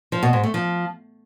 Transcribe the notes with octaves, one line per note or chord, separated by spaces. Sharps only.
F3
B2
G#2
A3
F3